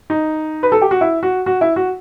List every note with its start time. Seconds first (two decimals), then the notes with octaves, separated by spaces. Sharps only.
0.10 D#4
0.63 B4
0.72 A4
0.82 G4
0.91 F#4
1.01 E4
1.23 F#4
1.46 F#4
1.61 E4
1.76 F#4